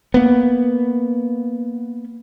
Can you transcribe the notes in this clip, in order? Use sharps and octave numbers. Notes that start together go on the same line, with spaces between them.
A#3 B3